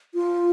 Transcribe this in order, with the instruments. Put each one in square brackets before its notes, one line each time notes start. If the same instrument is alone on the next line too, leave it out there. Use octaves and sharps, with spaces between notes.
[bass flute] F4